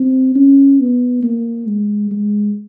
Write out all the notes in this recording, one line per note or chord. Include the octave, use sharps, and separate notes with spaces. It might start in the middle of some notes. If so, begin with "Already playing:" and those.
Already playing: C4
C#4
B3
A#3
G#3
G#3